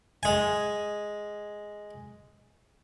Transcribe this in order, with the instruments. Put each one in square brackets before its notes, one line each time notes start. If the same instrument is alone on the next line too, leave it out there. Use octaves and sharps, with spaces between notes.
[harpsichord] G#3 G#5